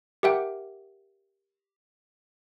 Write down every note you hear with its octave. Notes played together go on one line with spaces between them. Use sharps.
G4 A#4 E5 F#5 G5 D6